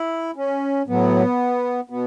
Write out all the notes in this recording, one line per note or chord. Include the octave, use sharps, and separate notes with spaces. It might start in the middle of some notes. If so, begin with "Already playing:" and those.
Already playing: E4
C#4
A2 F#3 B3
B2 B3